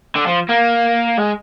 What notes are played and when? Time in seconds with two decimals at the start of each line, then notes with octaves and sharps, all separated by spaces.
0.16 D3
0.27 F3
0.49 A#3
1.18 G#3